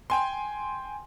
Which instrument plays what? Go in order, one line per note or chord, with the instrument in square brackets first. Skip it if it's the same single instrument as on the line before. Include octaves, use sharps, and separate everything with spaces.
[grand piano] G5 G#5 C6